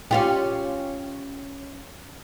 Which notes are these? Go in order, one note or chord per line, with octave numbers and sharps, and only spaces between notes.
C#4 F4 G4